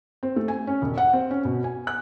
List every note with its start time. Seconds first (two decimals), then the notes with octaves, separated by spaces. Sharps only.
0.23 C4
0.36 A3
0.48 G#5
0.67 C#4
0.82 E1
0.97 F#5
1.13 C4
1.31 C#4
1.45 B2
1.64 G#5
1.87 F#6